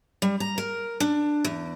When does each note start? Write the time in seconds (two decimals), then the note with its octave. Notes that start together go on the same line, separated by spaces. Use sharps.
0.22 G3
0.40 A#5
0.58 A#4
1.00 D4
1.45 E2